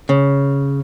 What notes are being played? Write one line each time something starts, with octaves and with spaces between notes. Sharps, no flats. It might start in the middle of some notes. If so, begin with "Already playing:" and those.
C#3